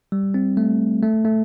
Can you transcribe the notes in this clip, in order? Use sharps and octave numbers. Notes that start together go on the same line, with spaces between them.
G3
C4
A3
A3
A3